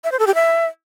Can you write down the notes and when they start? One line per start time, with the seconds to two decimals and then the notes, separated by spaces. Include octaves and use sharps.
0.04 E5
0.12 C5
0.19 A4
0.27 G4
0.35 E5